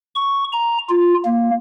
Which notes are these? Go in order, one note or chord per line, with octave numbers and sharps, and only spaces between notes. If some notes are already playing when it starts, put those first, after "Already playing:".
C#6
A#5
F4
A#3